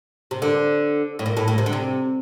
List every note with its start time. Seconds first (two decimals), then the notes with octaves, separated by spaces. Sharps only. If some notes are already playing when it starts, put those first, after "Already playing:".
0.31 C3
0.42 D3
1.19 A2
1.26 A#2
1.37 A2
1.48 A2
1.58 C3
1.66 D3
1.73 C3